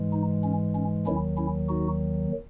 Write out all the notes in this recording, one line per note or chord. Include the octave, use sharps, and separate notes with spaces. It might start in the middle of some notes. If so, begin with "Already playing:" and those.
Already playing: G#2 E3 G#3
D#4
C#4
C#4
D#2 D#3 F#3 C#4 E4
C#4 E4
D#4 F#4